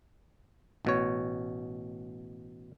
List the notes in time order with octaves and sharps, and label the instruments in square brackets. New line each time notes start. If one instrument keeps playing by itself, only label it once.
[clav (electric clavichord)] A1 B2 C#5